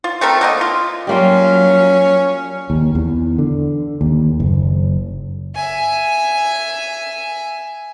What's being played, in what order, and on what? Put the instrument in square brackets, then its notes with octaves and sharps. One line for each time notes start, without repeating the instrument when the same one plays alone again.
[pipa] F4
A3 C4 A4 A#4
D3 A#3 D#5
F4
[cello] F#3 [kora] G3 A#3 F4 [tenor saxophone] C#4
[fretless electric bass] D#2
E2
D3
D#2
F#1
[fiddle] E5 G#5